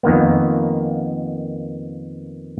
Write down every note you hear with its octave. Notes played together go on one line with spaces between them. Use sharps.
F2 D#3 A#3 B3